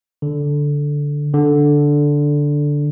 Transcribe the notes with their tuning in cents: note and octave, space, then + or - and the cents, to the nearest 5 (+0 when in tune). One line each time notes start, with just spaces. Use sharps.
D3 -10
D3 -5